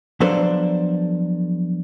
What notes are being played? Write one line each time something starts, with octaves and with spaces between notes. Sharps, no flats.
F3 F#3 B3 D4 A4 C5